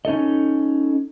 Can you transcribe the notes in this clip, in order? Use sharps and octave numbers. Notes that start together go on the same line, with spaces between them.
C#4 D#4 A4 D#5